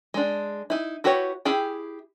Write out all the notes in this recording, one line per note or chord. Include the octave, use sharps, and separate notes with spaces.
G#3 D4
D#4 E4
E4 F#4 G4 B4 C#5
E4 G4 G#4 G5